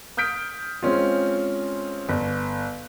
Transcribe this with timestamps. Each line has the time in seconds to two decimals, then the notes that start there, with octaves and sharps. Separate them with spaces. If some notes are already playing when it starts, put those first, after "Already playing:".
0.17 D#6 F6 G6 B6 D7
0.83 G#3 C4 C#4 F4
2.09 G1